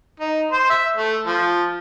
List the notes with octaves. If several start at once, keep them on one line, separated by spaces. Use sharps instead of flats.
D#4
C5
E5
A3
F3